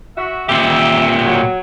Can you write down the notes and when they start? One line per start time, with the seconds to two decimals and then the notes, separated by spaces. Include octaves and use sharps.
0.17 F#4 E5
0.49 A#2 G4 E5
1.25 F#3